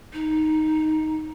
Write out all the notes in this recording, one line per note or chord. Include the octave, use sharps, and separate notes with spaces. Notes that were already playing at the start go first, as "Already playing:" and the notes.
D#4